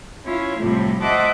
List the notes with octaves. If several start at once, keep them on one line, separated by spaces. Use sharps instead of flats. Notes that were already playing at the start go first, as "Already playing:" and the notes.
C#4 E4 F4 C#5
A2 C3 F3 G3 A3
C5 D#5 E5 F#5 A5 D6